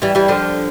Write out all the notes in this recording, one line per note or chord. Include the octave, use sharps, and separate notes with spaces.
E3 G3
E3 G3
D3 F3